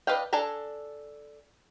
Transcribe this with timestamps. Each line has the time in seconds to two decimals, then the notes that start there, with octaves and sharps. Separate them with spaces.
0.07 D4 B4 D#5 F5 G5
0.33 D4 A4 G#5 A#5